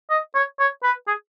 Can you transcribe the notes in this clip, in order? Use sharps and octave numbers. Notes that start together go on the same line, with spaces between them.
D#5
C#5
C#5
B4
G#4